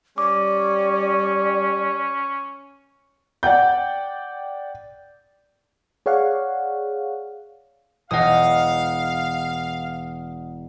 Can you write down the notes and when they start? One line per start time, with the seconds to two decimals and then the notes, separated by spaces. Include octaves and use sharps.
0.18 G3 C#4 D5 D6
3.43 D5 F#5 G5 G6
6.06 G#4 C#5 D5 F5 F#5
8.11 E1 D#5 F5 F#5 D#6